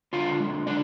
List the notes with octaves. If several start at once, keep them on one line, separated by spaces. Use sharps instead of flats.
D3 F4 F5
G#3
D3 D4 D5